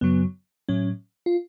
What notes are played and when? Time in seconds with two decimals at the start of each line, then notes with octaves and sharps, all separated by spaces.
0.01 F#2 C#3 F#3 B3
0.69 A2 F#3 C#4
1.26 F4